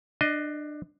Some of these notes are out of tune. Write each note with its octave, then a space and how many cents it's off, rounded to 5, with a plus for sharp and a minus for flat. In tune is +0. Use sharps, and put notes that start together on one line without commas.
D4 +25 D#5 +5